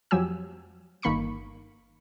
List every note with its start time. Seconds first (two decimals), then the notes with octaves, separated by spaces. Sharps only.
0.11 F2 F3 F#3 G4 G#5 E6
1.02 G1 D#3 A#3 B5 C#6 C#7